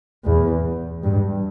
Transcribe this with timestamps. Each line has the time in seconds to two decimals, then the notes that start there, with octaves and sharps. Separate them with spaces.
0.25 E2
1.03 G2